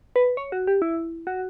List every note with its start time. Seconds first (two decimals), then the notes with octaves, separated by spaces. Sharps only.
0.16 B4
0.37 C#5
0.52 F#4
0.67 G4
0.82 E4
1.27 F#4